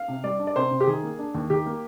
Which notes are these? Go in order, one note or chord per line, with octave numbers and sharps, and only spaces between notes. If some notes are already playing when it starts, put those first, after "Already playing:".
Already playing: F5
C3
G3 D5
D4
D5
C3 C5
C3
G4
D#3 G#4
A#3
D4
D#2
D#3 G4
A#3